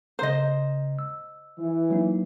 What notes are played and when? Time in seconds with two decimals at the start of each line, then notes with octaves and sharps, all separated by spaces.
0.19 C#3 C5 D#5 A#5
0.99 E6
1.59 E3
1.90 F#3 A#3 D#4